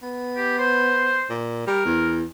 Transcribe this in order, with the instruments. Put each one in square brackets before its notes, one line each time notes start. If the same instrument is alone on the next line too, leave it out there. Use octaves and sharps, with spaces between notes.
[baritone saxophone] B3
[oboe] G4
C5
[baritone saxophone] A#2
[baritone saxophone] G3 [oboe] A#4
[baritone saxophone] E2